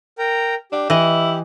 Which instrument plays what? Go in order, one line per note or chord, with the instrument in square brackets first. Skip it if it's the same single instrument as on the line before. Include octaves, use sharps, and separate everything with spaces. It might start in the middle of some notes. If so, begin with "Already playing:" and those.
[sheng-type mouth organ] A#4 G5 A#5
[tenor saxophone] D4 [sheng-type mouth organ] G4
[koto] E3 D#5 [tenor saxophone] E4